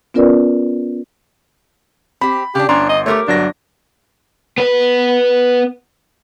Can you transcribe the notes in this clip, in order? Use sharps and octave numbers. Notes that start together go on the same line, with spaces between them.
B3 C#4 F4 A#4 B4 D5
C4 G4 B5
C#3 D4 G4
G1 C#4 D4 A#5 C6
D#5
A3 G4 A#4 C#5
G1 F#3 D4 A#6
B3 B4